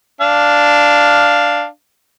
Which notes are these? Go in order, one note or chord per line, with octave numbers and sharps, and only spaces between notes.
D4 F5